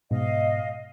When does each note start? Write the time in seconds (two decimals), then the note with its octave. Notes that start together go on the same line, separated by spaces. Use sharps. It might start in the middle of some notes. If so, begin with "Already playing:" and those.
0.11 G#2 B2 D#5 F5